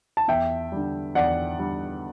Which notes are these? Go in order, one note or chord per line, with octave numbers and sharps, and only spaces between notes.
A5
E2 E5 G5
D3 G3
E2 D5 F#5
D3 G3